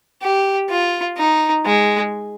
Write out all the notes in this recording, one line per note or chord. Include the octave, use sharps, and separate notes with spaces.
G4
F4
D#4
G#3